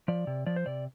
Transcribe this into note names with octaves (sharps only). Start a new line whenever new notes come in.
F3 D5
C3
F3 D5
C5
C3 D5